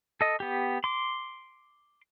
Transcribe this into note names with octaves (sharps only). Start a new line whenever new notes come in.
A4 D#5
B3 G4
C6 D6